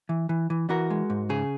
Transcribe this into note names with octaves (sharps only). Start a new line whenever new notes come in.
E3
E3
E3
E3 F#4 A#4
G#3
G#2
C#3 G#4